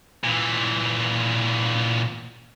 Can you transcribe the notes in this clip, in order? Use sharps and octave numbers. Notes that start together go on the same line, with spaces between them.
A#2 E3